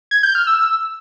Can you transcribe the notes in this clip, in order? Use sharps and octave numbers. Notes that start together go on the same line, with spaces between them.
G#6
G6
F6
E6